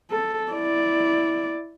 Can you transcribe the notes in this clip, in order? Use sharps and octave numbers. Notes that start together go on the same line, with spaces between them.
A4
E4 D5